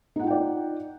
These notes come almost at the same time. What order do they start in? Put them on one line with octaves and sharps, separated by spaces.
D#4 F#5 F4 G5 D5